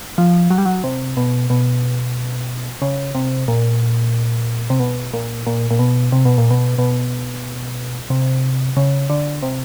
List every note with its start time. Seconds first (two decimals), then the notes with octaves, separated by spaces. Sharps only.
0.18 F3
0.51 F#3
0.58 G3
0.65 F#3
0.84 C3
1.17 B2
1.50 B2
2.82 C#3
3.15 C3
3.48 A#2
4.70 C3
4.80 B2
5.13 A#2
5.47 A#2
5.71 A#2
5.79 B2
6.12 C3
6.25 B2
6.38 A#2
6.51 B2
6.79 B2
8.10 C3
8.77 C#3
9.10 D3
9.43 C3